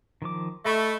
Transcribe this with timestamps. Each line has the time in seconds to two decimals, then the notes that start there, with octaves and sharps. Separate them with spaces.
0.22 D#3 F3 D6
0.65 A3 D#5 B5 C#6